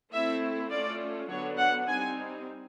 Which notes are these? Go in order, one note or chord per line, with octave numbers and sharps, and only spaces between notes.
A3 C4 E4 E5
A3 C#4 F4 D5
D3 F#3 B3 D4 C#5
F#5
G3 C4 D#4 G#5